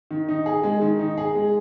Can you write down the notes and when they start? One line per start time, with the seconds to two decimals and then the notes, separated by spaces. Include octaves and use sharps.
0.11 D#3
0.28 D#4
0.46 G#4
0.63 G#3
0.82 D#3
0.99 D#4
1.18 G#4
1.35 G#3